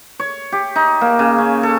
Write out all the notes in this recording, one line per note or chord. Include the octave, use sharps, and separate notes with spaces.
C#5
G4
D#4
A#3
C#3
C#4
A4